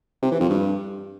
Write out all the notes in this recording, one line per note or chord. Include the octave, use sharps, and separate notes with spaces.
C3
E3
F2
G2